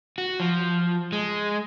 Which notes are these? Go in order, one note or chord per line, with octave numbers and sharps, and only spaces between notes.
F#4
F3
G#3